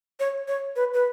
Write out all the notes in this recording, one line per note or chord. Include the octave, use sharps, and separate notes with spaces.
C#5
C#5
B4
B4